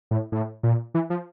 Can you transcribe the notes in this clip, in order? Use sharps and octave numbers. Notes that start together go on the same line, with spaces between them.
A2
A2
A#2
E3
F3